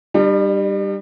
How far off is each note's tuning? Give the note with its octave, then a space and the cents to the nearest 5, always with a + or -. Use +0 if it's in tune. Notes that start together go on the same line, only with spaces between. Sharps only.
G3 +5 D4 +45